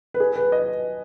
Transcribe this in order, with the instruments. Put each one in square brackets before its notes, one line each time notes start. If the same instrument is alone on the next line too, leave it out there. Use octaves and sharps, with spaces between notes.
[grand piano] B4
G#4
B4
D#5